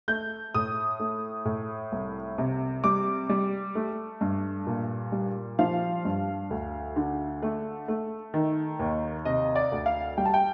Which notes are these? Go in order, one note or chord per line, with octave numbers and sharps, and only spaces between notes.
A3 G6
A2 D#6
A3
A2
C2
C3
G3 D6
G3
A3
G2
A#2
G3
F3 F5
G2
D2
D3
A3
A3
D#3
D#2
C3 D#5
D5
D2
F5
G3 G5
A5
G5